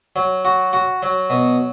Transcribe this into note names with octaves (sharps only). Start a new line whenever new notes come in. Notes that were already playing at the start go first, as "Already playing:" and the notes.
F#3
F#4
F#4
F#3
B2